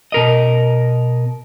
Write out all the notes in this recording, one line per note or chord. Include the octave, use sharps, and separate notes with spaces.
B2 A#4 D#5